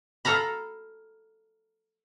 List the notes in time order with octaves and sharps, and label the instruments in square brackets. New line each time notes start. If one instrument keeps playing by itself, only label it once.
[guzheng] A4 F5 A#5 B5